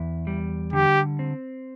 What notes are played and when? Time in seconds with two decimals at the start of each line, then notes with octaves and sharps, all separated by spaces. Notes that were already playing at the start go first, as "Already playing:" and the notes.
Already playing: E2 E4
0.27 G3
0.73 D3 G4
1.19 C4